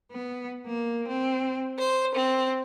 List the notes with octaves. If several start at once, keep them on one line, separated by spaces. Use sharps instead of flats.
B3
A#3
C4
C5
C4